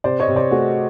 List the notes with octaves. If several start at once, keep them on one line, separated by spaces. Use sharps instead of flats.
C3 C5 D5
C#5 D#5
C3
C5 D5
A3 F#4 G#4